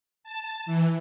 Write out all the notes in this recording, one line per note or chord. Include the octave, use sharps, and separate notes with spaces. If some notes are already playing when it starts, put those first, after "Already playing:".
A5
E3